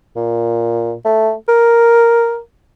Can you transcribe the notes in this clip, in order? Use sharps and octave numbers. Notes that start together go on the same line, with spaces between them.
A#2
A3
A#4